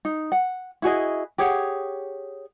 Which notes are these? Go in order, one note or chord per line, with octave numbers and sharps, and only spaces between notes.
D#4
F#5
E4 F#4 G#4 D#5
G4 G#4 C#5 F#5